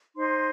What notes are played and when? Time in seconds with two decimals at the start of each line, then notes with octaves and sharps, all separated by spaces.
0.16 D#4 C5 C6